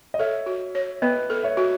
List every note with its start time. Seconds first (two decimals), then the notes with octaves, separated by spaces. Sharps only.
0.14 D#5
0.19 A4 C#5 E5
0.46 F#4
0.75 C#5
1.02 B3 B4 D#5
1.30 A4
1.43 C#5 E5
1.57 F#4